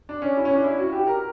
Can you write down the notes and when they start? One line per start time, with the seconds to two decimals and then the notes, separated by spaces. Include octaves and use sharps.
0.09 D4
0.22 C#4
0.37 E4
0.45 C#4
0.55 D4
0.64 E4
0.78 F#4
0.92 G4
1.07 A#4